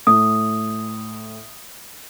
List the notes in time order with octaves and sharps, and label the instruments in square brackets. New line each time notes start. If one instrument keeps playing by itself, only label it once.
[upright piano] A2 [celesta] D#6